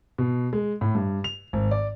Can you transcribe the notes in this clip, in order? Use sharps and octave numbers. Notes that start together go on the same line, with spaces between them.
B2
G#3
A2
G2
F7
G#1
D5